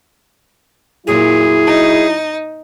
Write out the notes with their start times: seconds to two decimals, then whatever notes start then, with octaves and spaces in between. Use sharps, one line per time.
1.07 A#2 F#3 E4 G#4
1.66 D#4